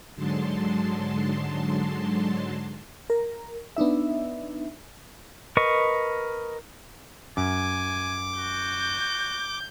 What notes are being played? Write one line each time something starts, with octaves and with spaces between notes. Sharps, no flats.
G#2 D3 F#3 G#3 A5 C6
A#4
B3 D4 D#4 E5
A#4 B4 D#5 C#6
F#2 G#5 D6
F#4 G6